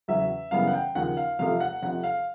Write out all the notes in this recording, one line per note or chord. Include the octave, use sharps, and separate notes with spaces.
E2 C#3 F#3 E5
F#2 C#3 E3 G3 B3 F5
F#5
G5
D#2 C#3 F3 F#5
F5
F1 F2 C3 F3 A3 F5
F#5
F2 C3 F3 F#5
F5